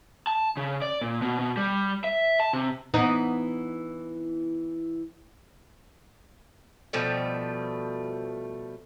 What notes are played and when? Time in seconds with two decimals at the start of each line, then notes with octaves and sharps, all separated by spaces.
0.27 A5
0.57 C#3
0.82 D5
1.01 A#2
1.22 B2
1.39 B2
1.57 G3
2.04 E5
2.40 A5
2.53 C3
2.94 E3 B3 D#4
6.93 B2 F3 G3 A3